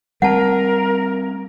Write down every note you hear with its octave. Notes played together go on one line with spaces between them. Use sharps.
G3 A3 C4 A#4 F#5 A5